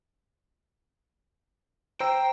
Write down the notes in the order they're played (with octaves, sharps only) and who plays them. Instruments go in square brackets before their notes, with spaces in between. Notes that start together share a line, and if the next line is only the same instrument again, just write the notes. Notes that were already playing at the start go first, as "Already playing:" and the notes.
[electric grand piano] C5 A#5 E6 [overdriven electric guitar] G5